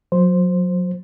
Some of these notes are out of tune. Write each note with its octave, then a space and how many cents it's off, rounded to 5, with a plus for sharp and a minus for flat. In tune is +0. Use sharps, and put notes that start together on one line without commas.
F#3 -30 C5 +0